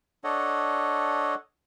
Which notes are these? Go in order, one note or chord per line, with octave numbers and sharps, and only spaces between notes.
D4 A4 C#5 D#5 F#5